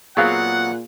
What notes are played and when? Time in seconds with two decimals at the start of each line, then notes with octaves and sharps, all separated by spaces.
0.17 A#2 F#3 B3 C4 G#4 F5 F#5